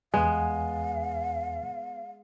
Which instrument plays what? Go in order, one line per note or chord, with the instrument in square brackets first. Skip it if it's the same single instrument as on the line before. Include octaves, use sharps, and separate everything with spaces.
[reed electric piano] E2 G#5 [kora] G#3 B3 [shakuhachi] F5